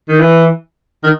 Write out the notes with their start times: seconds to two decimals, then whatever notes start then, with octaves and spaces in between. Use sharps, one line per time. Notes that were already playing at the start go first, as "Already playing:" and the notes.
0.08 D#3
0.20 E3
1.03 D#3